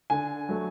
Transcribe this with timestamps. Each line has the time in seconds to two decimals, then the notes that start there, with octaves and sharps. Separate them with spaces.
0.10 D3 G#5
0.49 F#3 A3